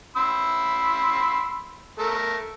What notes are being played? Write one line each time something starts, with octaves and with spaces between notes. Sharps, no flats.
B5 C6 E6
A3 A#4